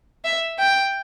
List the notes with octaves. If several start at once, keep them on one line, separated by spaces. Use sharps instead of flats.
E5
G5